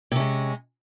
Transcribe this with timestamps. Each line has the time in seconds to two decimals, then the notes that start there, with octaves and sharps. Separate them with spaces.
0.11 C3
0.16 C#4
0.20 G#3